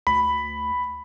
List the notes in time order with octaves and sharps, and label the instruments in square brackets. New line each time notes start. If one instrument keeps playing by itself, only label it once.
[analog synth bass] D2 [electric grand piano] B5